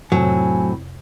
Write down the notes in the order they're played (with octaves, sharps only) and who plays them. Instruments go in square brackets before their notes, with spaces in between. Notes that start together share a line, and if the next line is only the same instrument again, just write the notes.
[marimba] F2 C3 C#5 [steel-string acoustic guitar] A2 C4 [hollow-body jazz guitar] F#3 [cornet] G#5